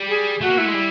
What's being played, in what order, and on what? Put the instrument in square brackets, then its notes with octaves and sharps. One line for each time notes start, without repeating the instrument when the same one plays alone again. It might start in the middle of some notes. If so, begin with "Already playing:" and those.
Already playing: [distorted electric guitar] G3
[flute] G#4
[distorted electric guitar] A3 [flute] F#4
[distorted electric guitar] A#3
[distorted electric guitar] A3 [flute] E4
[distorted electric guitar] G#3
G3